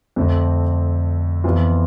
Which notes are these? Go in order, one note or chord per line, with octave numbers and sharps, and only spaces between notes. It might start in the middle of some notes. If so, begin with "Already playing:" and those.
F2 D3 A3 C4
F2 E3 B3 F4